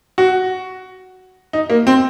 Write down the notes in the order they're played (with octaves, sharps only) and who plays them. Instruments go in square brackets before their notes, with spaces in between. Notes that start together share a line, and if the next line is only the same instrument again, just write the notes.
[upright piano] F#4
D#4
A#3
C4